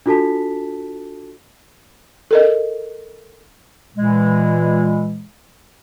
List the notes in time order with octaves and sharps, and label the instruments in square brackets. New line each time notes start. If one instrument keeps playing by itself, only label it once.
[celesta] D4 F4 F#4 A4 A5 B6
[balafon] A4 A#4 D#5
[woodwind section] A#2 E3 G#3